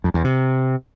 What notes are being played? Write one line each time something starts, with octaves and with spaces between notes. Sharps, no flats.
F2
E2
C3